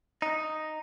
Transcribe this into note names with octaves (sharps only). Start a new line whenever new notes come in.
D#4